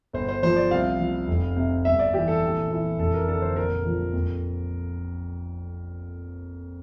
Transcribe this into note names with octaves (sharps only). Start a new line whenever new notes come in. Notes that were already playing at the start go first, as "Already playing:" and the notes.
G1 C5
C5
F3 C5
D5
C2 F5
F3
F1
C3
G1 E5
D5
E3 G4
A4
A#1
E3
F1 A4
A#4
D3 A4
C5
A#1 A#4
F3
F2